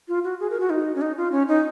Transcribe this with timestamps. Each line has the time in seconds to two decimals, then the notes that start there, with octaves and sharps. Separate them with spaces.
0.08 F4
0.24 F#4
0.40 G#4
0.50 A#4
0.60 F#4
0.70 D#4
0.95 C#4
1.01 D#4
1.17 F4
1.32 C#4
1.48 D#4